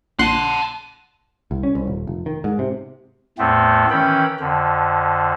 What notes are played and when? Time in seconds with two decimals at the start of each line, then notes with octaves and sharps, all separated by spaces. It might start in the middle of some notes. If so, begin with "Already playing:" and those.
0.19 A#1 F#5 A5 C6 F#6
1.51 C2
1.63 C#4
1.75 C2
1.87 D#1
2.07 F1
2.26 D#3
2.44 G#2
2.59 C3
3.38 E2 A2 A3 B3 C4
3.91 D#3 E3 C#4 G5 B5
4.40 F2 D3